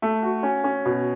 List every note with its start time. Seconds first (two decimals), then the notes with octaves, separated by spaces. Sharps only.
0.02 A3
0.22 F#4
0.43 C#4
0.64 C#4
0.85 B2